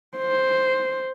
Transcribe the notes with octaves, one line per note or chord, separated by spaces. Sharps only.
C5